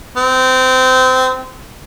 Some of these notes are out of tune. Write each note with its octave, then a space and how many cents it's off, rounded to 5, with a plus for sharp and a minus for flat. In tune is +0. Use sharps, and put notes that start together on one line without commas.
C4 -25